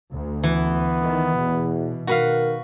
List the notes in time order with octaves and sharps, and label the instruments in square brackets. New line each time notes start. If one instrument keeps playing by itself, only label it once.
[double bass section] D2
[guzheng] E3 [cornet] B3
[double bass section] D#3
[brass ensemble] E2 [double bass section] B2
[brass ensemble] D#3 A#4 [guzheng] F#4 B4 F5